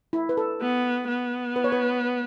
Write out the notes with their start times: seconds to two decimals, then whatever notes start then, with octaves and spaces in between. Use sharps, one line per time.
0.13 E4
0.29 B4
0.37 A4
0.61 B3
1.08 B3
1.56 B4
1.64 C#5
1.72 B4